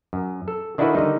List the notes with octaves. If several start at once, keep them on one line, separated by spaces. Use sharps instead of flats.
F#2
A4
D#3 D4 E4 F#4 A4 B4
D3 D#3 G3 D#4